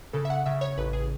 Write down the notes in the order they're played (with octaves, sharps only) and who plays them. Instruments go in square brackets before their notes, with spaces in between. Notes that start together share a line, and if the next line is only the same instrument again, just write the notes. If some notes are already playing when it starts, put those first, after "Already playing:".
[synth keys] C#3 A4
E5
F#5
C#3 E5
C#5
A1 B4
G#4